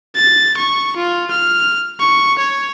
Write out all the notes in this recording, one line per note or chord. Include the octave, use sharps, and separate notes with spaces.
A6
C#6
F4
F6
C#6
C#5